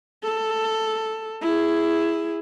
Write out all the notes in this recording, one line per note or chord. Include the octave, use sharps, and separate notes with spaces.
A4
E4 G#4